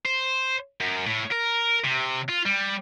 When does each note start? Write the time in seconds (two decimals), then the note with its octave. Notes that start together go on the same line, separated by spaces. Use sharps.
0.06 C5
0.80 F#2
1.06 A2
1.31 A#4
1.84 C3
2.29 F4
2.45 G3